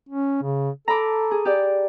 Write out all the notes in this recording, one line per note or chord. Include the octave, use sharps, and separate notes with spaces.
C#4
C#3
A4 A#5 B5 D6
G#4
G4 D5